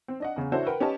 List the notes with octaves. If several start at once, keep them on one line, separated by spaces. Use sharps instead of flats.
C4
D4 D#5 F#5
E2 C#3
D4 E4 F#4 A4 C5 C#5
A#4 B4 F#5 G5
C#4 G4 B4 D#5 A5